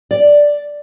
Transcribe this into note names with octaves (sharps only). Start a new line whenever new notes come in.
D5